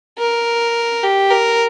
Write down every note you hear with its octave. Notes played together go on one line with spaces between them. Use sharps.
A#4
G4
A#4